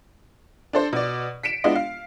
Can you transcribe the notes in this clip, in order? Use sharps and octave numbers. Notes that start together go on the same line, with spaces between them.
D4 A4 C5
B2 D5
B6 C#7 D7 E7
G#3 B3 D4 E4 F4 D#5
F5